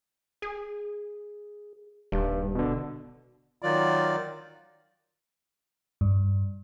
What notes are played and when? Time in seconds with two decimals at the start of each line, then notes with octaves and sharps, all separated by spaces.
0.42 G#4
2.12 D#1 G2
2.55 B2 D3
3.62 D#3 F#3 F4 D5
6.01 G2